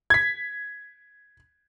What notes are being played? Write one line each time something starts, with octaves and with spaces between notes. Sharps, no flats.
G#6 B6